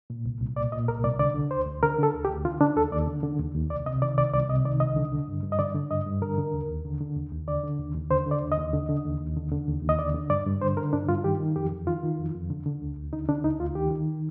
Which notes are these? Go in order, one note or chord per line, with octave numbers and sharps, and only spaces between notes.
A#2
C2
C2
A#2 D5
A#2 D#5
C2 A#4
C2 D5
D3 D5
D3
D2 C5
D2
D3 A#4
D3 A4
D2
G4
D2
D3 F4
D3 D4
D#2 A4
D#2 D5
D3
D3
D#2
D#2
C2 D5
C3 D#5
D#3 D5
C2 D5
C2 D5
C3 D#5
D#3 D5
C2 D#5
D3
D3
G2
G2
D#5
D3 D5
D3
G2 D#5
G2
D3 A#4
D3
D#2
D#2
D3
D3
D#2
D#2
D3 D5
D3
D#2
D#2
D3 C5
D3
D5
D#2
D#5
D#2
D3
D3
D#2
D#2
D3
D3
D#2
D#2
D#5
D3 D5
D3
G2 D5
G2
D3 C5
D3 A#4
G2 D4
G2 F4
D#3 G4
D#3
F2 G4
F2
D#3 F4
D#3
F2
F2
D3
D3
D2
D2
D3 D#4
D3 D4
D2 D#4
D2 F4
D#3 G4
D#3